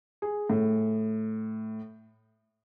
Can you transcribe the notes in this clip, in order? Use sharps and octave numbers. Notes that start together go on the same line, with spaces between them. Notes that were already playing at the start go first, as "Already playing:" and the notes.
G#4
A2